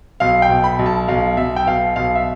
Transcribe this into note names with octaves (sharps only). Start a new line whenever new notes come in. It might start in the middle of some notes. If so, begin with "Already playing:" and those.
B1 F5
G5
B2
B5
B1
A5
B1 F5
B1 E5
G5
B2 F5
B1 F5
E5